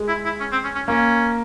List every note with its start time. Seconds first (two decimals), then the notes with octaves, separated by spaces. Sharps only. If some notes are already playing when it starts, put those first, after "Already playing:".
Already playing: G#3
0.08 E4
0.25 E4
0.40 C#4
0.52 C4
0.64 C#4
0.75 C#4
0.88 A#3 C#4